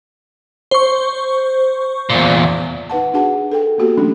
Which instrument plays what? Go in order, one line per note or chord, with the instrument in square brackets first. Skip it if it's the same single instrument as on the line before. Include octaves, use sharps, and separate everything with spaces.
[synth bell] C5 C#6
[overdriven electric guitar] E2 A#2
[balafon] D#4 B4 F#5 A5
D4 F#4 G#4 F#5 A5
A4 A#4 G5
A#3 B3 F#4 G4 A4
E3 F#3 A3 C#4 D4